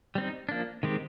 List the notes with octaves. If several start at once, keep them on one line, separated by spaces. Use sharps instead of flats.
G3 C4 D#4
F3 A#3 D4
D#3 G#3 C4 G4